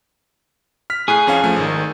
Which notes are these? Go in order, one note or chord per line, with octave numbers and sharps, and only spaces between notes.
F6 B6
A2 G#4 F#6
F2 C#4 F5
F3 A3
G#1 D#3